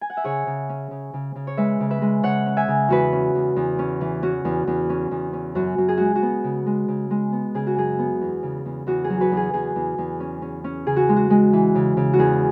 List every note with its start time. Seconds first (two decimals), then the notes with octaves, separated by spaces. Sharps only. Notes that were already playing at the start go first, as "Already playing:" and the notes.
0.01 G#5
0.10 F#5
0.17 E5
0.24 C#3 G#4 C#5
0.47 C#3
0.69 C#4
0.91 C#3
1.14 C#3
1.36 C#3
1.47 C#5
1.57 G#3 B4 E5
1.80 C#3
1.90 B4 E5
2.02 G#3
2.23 C#3 C#5 F#5
2.46 C#4
2.57 E5 G#5
2.68 C#3
2.88 E2 F#4 B4
3.12 C#4
3.35 E2
3.56 E2
3.79 C#4
4.01 E3
4.23 C#4 F#4
4.45 E2
4.67 E2
4.89 C#4
5.11 E2
5.33 C#4
5.55 F#2 F#4
5.78 F#2
5.88 G#4
5.97 G#3 F#4
6.15 F#4
6.22 B3
6.44 C#3
6.66 G#3
6.88 C#3
7.11 G#3
7.32 B3
7.54 C#3 G#4
7.67 F#4
7.77 F#2 G#4
7.99 B3
8.21 E2
8.43 C#3
8.65 E2
8.86 E2 F#4
9.04 G#4
9.10 F#3
9.20 F#4 B4
9.32 E2
9.37 G#4
9.53 E2 G#4
9.76 E2
9.98 E2
10.20 C#4
10.42 C#4
10.64 C#4
10.87 C#3 G#4
10.96 F#4
11.09 G#3
11.16 F#4
11.30 G#3
11.53 E3
11.75 C#3
11.97 C#3
12.13 F#4
12.19 E2 G#4